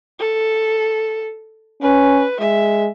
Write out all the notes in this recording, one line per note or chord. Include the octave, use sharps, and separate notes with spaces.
A4
C#4 B4
G#3 E5